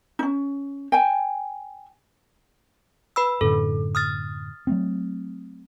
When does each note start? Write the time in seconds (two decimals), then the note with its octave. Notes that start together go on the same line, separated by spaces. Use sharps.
0.19 C#4 D#4
0.92 G5 G#5
3.16 B4 B5 E6
3.41 F#2 A2 D3 A4
3.95 D#6 F6 A6
4.67 F#3 A3 C4